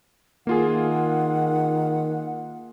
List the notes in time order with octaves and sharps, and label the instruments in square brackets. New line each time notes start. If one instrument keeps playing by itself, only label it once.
[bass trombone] D#3 [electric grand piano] A#3 F4 G#4 [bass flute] F#5